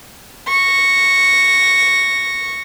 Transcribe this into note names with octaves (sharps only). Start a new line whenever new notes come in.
C#6 A#6